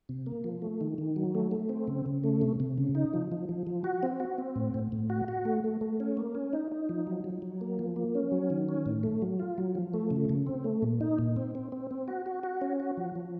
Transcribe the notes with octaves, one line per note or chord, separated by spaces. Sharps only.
C3
A#3
F3
A3
D#3
D#3
F#3
A3
A3
C4
C#3
C#3
A3
C3
C3
C#3
D#4
F3
F3
F3
F3
F#4
C4
F#4
C4
A2
A2
A2
F#4
F#4
A3
A3
A3
C#4
A#3
C#4
D#4
D#4
F3
F#3
F#3
F#3
A#3
F3
A#3
C#4
F#3
D#3
C#4
A2
A3
F#3
F4
F#3
F3
A3
C#3
C#3
C4
A3
A#2
D#4
A#2
C4
C4
C4
C4
F#4
F#4
F#4
C#4
F#4
F3
F3